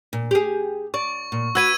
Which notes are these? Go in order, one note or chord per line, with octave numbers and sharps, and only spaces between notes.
A#2
G4 G#4
D5 C#6
A#2
F#4 B4 E6 G#6 D#7